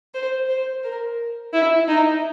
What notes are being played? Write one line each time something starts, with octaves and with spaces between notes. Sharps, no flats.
C5
C5
A#4
E4
D#4